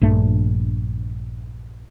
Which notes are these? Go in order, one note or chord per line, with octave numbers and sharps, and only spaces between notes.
A#1 G2 A3